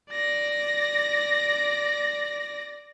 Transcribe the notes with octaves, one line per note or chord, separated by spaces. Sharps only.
D5 A#6